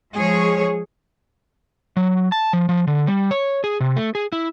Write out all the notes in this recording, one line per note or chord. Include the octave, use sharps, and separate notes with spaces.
F3 G#3 G#4 C#5
F#3
A5
F3
F3
D3
G3
C#5
G#4
C3
A3
G#4
E4